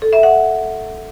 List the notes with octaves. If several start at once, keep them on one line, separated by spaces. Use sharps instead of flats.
A4
E5
F#5